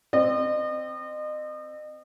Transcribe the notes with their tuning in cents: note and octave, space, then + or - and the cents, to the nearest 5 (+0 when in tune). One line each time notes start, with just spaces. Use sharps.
C4 -10 D#5 -35